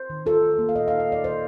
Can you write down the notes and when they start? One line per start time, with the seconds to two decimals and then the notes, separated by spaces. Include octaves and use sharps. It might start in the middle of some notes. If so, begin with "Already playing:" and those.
Already playing: C5
0.10 D#3
0.26 F4 A4
0.43 F4
0.58 A#3
0.69 F5
0.75 A#2 D#5
0.88 D#4 F5
1.00 D#5
1.08 D#4 D5
1.24 D#3 C5